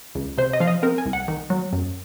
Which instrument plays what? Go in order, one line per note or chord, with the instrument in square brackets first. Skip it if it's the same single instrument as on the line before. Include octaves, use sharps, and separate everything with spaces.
[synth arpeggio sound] C#2
C3 C5
D#5
F3 F5
D#5
C4 A#4
G#5
C2
F#5
D#3
F#3
F#2